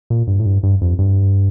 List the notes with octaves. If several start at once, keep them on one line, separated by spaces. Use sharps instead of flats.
A#2
G2
A2
G2
G2
F2
G2